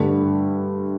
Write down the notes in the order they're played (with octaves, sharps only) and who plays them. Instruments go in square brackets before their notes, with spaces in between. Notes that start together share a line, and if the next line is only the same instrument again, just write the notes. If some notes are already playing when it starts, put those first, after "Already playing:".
Already playing: [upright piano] G2 D3 A3